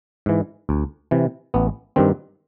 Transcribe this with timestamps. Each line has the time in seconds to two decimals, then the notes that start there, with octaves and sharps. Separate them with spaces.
0.26 G#2 E3
0.69 D2
1.11 C3 E3
1.54 A1 B3
1.96 G2 D#3 C4